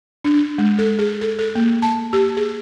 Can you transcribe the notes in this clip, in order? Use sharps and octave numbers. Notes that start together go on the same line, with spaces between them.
D4
G#3
A4
G#4
A4
A4
A#3
A5
G4
G#4